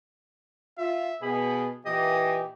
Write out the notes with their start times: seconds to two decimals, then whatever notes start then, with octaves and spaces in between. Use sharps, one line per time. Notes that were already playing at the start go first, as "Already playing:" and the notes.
0.78 F4 E5
1.22 B2 G#4 B5
1.86 A#2 E3 G4 D#5